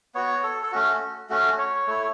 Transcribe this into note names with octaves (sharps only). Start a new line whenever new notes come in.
B3 F#4 C#5
A4
A4
A3 C#4 F#4
A3 C#4 F#4
C#5
A3 E4